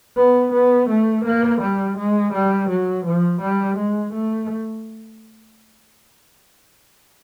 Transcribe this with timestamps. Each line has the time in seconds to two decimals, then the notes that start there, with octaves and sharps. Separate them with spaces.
0.17 B3
0.53 B3
0.90 A3
1.25 A#3
1.62 G3
1.98 G#3
2.34 G3
2.70 F#3
3.06 F3
3.42 G3
3.78 G#3
4.14 A3